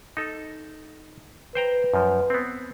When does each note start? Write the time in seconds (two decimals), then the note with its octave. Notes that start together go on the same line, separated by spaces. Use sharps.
0.17 D#4 A4
1.55 B4 C5 G5 A#5
1.94 F#2 F3
2.30 B3 C4